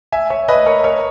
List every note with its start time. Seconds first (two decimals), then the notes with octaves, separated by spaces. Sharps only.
0.12 E5 G#5
0.30 C#5 E5
0.48 B4 D#5
0.66 A#4 C#5
0.84 A#4 C#5